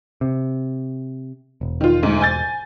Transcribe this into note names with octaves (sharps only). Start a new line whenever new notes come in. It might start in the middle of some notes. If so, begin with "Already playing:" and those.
C3
E1
D#3 F4
D2 G#2
G#5 G6 A6